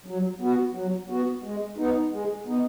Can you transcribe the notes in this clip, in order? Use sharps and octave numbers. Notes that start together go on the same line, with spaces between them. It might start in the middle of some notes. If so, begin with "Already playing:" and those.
F#3
B3 F#4
F#3
B3 F#4
G#3
B3 D#4
G#3
B3 D#4